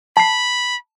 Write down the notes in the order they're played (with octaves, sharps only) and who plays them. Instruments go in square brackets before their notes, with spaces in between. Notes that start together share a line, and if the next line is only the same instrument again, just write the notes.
[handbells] A5 C7 [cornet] B5